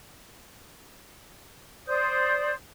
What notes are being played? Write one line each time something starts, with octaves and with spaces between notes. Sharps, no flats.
C5 D5 D#6 G6